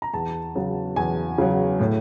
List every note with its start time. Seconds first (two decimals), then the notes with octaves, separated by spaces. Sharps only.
0.02 A#5
0.13 E2 A5
0.55 C#3 F#3
0.96 E2 G#5
1.38 C#3 F#3
1.79 A2